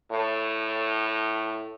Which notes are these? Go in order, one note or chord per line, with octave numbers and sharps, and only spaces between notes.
A2